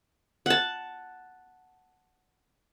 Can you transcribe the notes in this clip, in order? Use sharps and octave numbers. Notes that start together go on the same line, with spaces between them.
F#5 A5